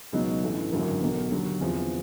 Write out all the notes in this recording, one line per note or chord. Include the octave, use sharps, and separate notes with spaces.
C#2 B2 F#3 B3 D#4
A1 G2 E3 A3
G#1 F#2 D3 F#3 A#3
B1 B2 F#3 A#3
D#2 D3 F#3
E2 C3 F3